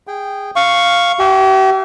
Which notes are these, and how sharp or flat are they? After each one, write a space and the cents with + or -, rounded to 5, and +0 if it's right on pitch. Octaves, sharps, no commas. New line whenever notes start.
G#4 -20 G5 -5
F5 +0 C#6 +0
G4 -40 E5 +30 G#5 +0